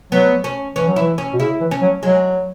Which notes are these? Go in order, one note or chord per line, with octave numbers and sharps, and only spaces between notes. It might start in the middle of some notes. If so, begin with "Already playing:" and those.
F#3 B3
C#4
E3 C#4
F#3
E3 E4
C#4
B2
C#3 E4
E3
C#4
F#3
F#3 G#3